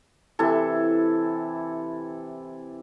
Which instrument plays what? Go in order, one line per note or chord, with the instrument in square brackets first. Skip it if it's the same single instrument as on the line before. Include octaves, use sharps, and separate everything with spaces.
[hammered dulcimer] C3 E3 E4 A4